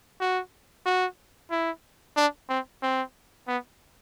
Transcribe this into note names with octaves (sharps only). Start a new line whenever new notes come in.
F#4
F#4
E4
D4
C4
C4
B3